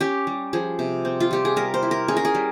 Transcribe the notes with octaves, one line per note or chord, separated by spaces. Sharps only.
C#4 G4
G3
F3 G#4
C3
C4
F4
G3 G4
G#4
G3 A#4
C5
E4
A#4
C#4 G#4
A#4
G#4
G3